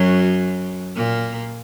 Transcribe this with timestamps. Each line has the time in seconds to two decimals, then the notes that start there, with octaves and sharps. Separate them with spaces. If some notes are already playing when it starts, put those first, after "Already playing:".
Already playing: F#2 F#3
0.96 A#2 A#3